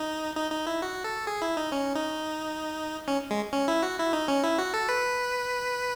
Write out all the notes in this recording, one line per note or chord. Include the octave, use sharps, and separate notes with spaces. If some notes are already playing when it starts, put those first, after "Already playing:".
Already playing: D#4
D#4
D#4
E4
F#4
A4
G#4
E4
D#4
C#4
D#4
C#4
G#3
C#4
E4
F#4
E4
D#4
C#4
E4
F#4
A4
B4